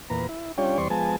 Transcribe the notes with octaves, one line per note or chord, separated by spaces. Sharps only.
E2 A#2 B4 A#5
E4
G3 C#4 D4 F4 C#5 G5
E2 G3 C4 D5 C6 C#6
F3 G#3 B3 G#5 A5